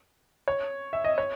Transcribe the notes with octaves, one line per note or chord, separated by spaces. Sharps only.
C#5
E5
D#5
C#5